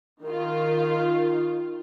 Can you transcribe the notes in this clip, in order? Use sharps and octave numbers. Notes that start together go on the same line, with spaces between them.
D#3 F4